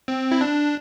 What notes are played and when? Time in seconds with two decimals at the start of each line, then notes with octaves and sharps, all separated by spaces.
0.08 C4
0.31 E4
0.41 D4